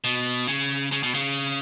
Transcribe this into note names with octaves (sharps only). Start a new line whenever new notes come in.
B2
C#3
C#3
B2
C#3